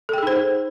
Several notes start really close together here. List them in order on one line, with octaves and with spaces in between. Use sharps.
A4 G5 G#4 D#4 C5